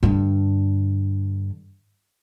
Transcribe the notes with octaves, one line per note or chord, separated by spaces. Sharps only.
G2 D3